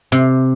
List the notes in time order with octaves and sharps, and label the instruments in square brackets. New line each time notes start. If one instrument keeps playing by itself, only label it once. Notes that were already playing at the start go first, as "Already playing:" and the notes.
[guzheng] C3